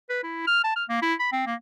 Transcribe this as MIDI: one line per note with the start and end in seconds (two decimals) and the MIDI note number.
0.10 0.20 71
0.23 0.44 64
0.47 0.61 89
0.64 0.74 81
0.76 0.84 89
0.89 0.99 58
1.02 1.14 64
1.20 1.29 83
1.32 1.44 60
1.46 1.55 58